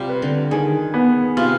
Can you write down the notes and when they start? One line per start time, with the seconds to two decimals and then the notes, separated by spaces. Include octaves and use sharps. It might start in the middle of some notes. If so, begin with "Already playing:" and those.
Already playing: C3 G3 F4
0.09 B4
0.22 D3
0.51 D#3 G#4
0.94 B3
1.37 C3 F4